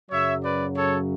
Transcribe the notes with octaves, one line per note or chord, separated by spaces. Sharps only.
F#2 C#3 F#3 C#5 E5
B4 D5
A4 C#5